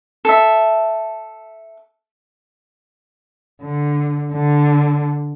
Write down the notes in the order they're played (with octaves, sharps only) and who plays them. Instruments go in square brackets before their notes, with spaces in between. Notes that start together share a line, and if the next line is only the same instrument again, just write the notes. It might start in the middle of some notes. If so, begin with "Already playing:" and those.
[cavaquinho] A4 E5
[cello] D3
D3